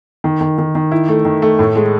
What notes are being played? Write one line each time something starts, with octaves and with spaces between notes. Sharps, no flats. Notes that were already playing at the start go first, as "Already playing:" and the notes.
D#3
D#3
D#3
D#3
E4
A3
D#3
A3
A2
G#3